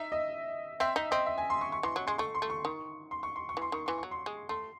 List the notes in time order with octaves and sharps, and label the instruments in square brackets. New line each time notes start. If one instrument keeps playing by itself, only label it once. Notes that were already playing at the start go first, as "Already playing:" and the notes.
Already playing: [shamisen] D#4 [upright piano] E5
[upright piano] D#5
[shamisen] C4 [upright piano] E5
[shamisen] D#4 [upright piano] D#5
[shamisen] C4 [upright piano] D#5
[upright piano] E5
G#5
C6
C#6
C#6
[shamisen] E3 [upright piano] C6
[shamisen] F#3 [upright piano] C#6
[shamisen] G#3 [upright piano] C6
[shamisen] A3 [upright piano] C#6
[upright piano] C6
[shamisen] A3
[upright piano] C#6
[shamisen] D#3
[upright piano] C6
C#6
C6
C#6
[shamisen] E3 [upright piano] C6
[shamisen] D#3 [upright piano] C#6
[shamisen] E3 [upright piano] C6
[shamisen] F#3 [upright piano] C#6
[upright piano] C6
[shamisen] G#3
[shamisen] A3 [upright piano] C6